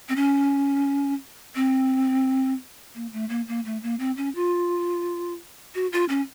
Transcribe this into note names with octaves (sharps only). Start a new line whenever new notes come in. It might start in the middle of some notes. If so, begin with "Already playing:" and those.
C4
C#4
C4
A#3
A3
A#3
A#3
A3
A#3
C4
C#4
F4
F#4
F4
C#4